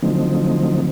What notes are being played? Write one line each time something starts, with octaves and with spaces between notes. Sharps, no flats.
D3 F3 F#3 A3 C4 D#4